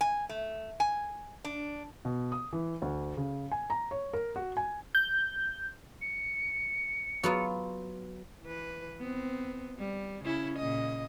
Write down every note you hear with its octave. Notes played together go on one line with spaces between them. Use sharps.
G#5
A3
G#5
D4
B2
D#6
E3
D2
C#3
G#5
A#5
C#5
A#4
F#4
G#5
G6
C#7
F#3 B3 F4
E3 B4
B3 C4
G3
C#3 C#4 E4
A#2 C#3 D#5